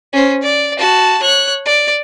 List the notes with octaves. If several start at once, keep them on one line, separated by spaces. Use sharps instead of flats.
C#4 C5
D5
F#4 A5
C#5 F#6
D5